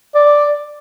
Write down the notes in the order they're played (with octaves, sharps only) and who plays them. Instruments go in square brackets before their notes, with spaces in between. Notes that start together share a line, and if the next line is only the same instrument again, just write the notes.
[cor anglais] D5